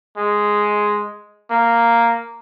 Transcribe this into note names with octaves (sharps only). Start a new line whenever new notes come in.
G#3
A#3